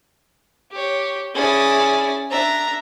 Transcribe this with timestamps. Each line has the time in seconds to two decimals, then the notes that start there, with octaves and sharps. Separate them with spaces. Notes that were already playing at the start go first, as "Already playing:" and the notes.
0.72 G4 C#5
1.35 C#4 E4 G#4 D5
2.30 D4 E5 A#5